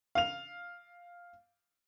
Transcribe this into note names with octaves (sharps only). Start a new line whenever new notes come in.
F5 F7